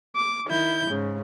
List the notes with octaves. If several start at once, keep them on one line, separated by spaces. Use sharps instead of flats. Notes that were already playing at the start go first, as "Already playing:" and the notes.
D6
D#3 E4 G6
G#2 C#3